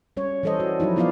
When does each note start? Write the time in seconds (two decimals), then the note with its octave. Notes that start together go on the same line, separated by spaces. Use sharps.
0.17 G3 C#4 C#5
0.43 E3 G3 A4 C5 D#5
0.60 F#4
0.80 F3 F#3 D#4 E4
0.96 F3 B3 E4 F4 D5 F5